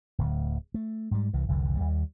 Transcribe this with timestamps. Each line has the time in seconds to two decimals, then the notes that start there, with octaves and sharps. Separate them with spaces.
0.18 D1 D2
0.74 A3
1.11 G#2 G3
1.33 C2 E3
1.48 F1 C2 D3 E3
1.77 D#2 G3